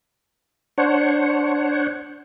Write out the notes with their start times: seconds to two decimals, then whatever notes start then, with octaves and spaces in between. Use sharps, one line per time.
0.78 D4 C5 C#5 F#5